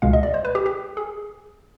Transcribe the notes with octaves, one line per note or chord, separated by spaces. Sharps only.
C#2 B2 G#3 F5
D#5
D5
C5
B4
G4
G4
G#4